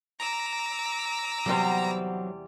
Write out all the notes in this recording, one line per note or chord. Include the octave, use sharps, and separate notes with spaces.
A#5 D6 E6
E2 C3 F#3 G3 B3 C4